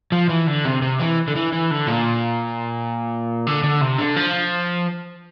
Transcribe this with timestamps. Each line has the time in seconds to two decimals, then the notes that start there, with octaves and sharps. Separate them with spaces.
0.12 F3
0.29 E3
0.47 D3
0.65 C3
0.82 C3
1.00 E3
1.28 D3
1.35 E3
1.53 E3
1.71 D3
1.87 A#2
3.47 D3
3.63 D3
3.81 C3
3.99 D3
4.17 F3